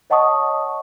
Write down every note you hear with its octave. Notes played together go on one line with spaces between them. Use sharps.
C#5 D#5 F#5 A5 C#6 D#6